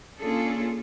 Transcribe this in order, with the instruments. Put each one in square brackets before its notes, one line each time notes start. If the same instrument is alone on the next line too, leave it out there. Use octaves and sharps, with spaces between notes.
[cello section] A#3 C#4 D4 F4 G#4 A4